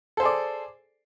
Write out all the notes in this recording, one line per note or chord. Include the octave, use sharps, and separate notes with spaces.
G#4 A4 C5 D5